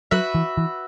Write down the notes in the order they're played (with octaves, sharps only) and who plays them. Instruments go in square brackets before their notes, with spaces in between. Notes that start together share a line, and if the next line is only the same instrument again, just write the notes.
[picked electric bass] F#3 [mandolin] F#4 B4 E5
[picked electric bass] E3
E3